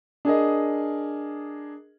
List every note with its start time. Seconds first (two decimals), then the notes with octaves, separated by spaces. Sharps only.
0.25 D4 G#4 A#4 D#5